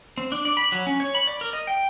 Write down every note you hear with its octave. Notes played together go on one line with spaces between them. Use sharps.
C4
D4
D5
B5
F#3
C#4
C#5
B5
D5
A#4
D#5
G5